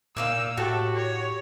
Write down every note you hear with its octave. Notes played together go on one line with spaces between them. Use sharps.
A#2 A#3 D#4 F5 E6
A2 F#4 G4 A4
C#5